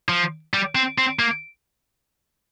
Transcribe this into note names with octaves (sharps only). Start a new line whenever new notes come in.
F3
G3
C4
C4
A#3